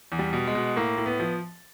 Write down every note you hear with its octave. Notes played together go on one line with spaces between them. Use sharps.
E2
G3
B2
G#3
B2
A2 A#3
A2
B3
F3